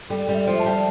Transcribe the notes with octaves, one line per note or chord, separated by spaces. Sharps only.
G3 A4
G3
E5
F3
A5
G3